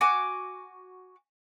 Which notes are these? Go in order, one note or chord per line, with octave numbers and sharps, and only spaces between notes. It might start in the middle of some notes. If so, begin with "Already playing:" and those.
F#4 G#5 D6